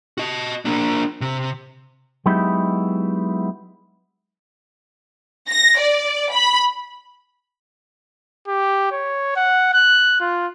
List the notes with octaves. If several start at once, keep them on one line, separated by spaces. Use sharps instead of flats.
F#4 D#5
A#3 D4
C3
F#3 G#3 B3 D#4 E4 G4
A#6
D5
B5
G4
C#5
F#5
F#6
F4